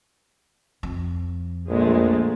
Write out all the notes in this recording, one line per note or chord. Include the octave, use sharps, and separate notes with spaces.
F2
A#1 A#2 G#3 A3